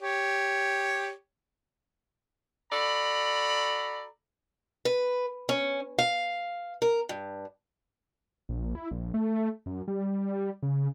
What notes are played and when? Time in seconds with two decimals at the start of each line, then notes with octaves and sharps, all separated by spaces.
0.01 G4 C#5
2.72 F#4 A4 D5 A#5 B5
4.85 B4
5.49 C#4
5.99 F5
6.82 A#4
7.09 G2
8.49 A#1
8.75 E4
8.91 A#1
9.14 A3
9.66 F#2
9.88 G3
10.63 C#3